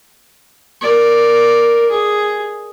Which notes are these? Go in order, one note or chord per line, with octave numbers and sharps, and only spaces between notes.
A#4 D5
G#4